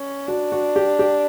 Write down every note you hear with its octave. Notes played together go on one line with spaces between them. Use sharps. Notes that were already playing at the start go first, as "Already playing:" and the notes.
Already playing: C#4
D4 F#4
F#4
G4
G4